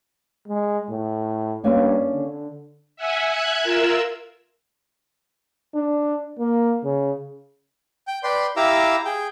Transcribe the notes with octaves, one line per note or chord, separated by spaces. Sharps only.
G#3
A2
G2 A#3 C#4 D4
D3
E5 F#5 G#5
E5 F#6 G#6
F4 A#4 E6
D4
A#3
C#3
G5
B4 D5 G5 C6
E4 G4 F5 A#5 D6 E6
G#4 G5